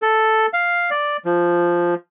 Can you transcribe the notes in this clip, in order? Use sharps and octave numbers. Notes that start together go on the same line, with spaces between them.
A4
F5
D5
F3